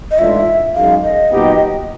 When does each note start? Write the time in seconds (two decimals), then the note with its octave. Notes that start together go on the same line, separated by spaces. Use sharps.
0.11 D#5
0.18 G#2 E3 A3 D4 F4 E5
0.75 F#2 D#3 G#3 F5
1.04 D#5
1.32 A#2 F#3 B3 D#4 G4